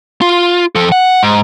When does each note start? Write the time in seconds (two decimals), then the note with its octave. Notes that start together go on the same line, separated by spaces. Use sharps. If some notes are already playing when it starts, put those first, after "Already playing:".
0.21 F4
0.75 F3 A4
0.92 F#5
1.23 G#2